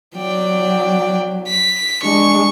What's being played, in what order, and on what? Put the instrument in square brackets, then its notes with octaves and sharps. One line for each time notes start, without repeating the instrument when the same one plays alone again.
[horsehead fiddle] F#3 [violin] D5 G5
[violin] B6
[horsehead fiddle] G#3 D4 [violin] C#6